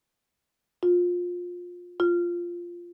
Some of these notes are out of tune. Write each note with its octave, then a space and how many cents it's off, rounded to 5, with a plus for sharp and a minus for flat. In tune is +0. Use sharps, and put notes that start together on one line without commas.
F4 +20
F4 -5